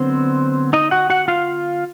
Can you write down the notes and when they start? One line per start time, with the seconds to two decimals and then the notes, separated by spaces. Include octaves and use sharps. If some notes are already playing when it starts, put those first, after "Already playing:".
Already playing: D3 F#3 B3 C4 C5
0.73 D#4 D#5
0.91 F#4 F#5
1.10 F#4 F#5
1.28 F4 F5